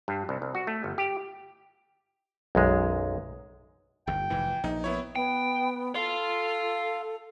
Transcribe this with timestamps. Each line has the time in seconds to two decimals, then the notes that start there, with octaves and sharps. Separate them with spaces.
0.08 G2
0.29 C2
0.42 C2
0.55 F#4
0.67 A3
0.84 G1
0.98 G4
2.55 B1 F#2 G#3
4.07 G1 D#2 G5
4.30 F1 G#2 E3
4.64 A#1 D#4
4.84 B3 E4 C#5
5.16 B3 G5
5.95 A4 F5 C6